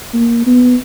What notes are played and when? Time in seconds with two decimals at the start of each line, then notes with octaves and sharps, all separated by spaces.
0.13 A#3
0.46 B3